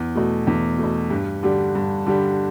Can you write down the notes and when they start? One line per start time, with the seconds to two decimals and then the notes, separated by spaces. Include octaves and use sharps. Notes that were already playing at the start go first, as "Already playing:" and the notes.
Already playing: E2
0.16 B2 A3
0.47 E2
0.79 B2 A3
1.10 G2
1.43 D3 G3 D4 G4
1.75 G2
2.06 D3 G3 D4 G4